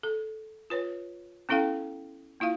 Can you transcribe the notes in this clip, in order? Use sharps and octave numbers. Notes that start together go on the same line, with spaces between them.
A4
F4 B4 C#5
B3 C#4 E4 A4 F5 G5
A#3 E4 F4 F5